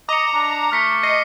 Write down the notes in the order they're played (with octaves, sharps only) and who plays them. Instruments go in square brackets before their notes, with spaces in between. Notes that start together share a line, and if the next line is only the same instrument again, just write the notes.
[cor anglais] D#5 [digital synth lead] A#5 [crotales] D6 C#7
[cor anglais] D4
[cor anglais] A3 [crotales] F6 B6 C#7
[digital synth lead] D#5 [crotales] C7 C#7